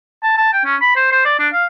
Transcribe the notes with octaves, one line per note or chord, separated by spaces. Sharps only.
A5
A5
G5
C#4
B5
C5
C5
D5
D4
F5